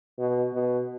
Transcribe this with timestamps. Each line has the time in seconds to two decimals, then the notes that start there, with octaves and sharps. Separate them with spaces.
0.19 B2
0.53 B2